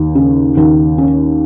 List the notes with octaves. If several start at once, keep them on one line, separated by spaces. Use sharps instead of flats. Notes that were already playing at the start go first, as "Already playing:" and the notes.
Already playing: D#2
C#3
D#2
C#4